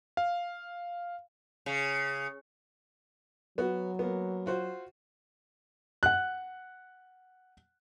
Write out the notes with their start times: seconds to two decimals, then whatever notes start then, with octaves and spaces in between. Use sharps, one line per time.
0.17 F5
1.66 C#3
3.58 F#3 B3 F#4
3.99 A#3 B3
4.46 F4 F#4 C5
6.03 F#5 F#6